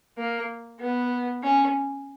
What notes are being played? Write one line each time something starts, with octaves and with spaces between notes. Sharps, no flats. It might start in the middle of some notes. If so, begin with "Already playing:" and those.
A#3
B3
C#4